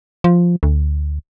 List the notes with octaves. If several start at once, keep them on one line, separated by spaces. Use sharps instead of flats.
F3
D2